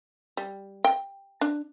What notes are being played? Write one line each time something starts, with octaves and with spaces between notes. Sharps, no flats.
G3
G5
D4